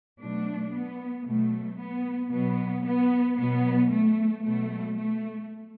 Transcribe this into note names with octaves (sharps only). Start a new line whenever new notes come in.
B2 F#3 A3 D4
B3
B2 F#3 A3
B3
B2 F#3 B3
B3
B2 F#3 B3
A3
B2 F#3 A3
A3